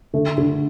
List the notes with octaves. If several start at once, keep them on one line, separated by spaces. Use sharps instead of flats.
D3 A3
D3